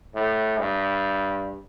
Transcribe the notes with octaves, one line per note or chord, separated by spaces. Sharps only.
A2
G2